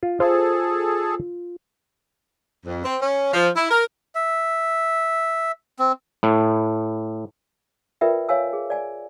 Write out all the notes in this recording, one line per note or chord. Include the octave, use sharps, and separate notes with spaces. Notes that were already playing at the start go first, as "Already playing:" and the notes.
F4
F4 G#4 A4 C5
F2
C4
C#4
F3
E4
A#4
E5
C4
A2
F4 A#4 B4 D5 E5 G5
C#5 F5 G#5 E6
G#4
D5 G#5